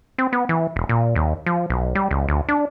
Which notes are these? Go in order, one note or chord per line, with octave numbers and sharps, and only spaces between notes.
C4
B3
E3
E1
A#2
D#2
F3
B1
G3
C#2
D2
D4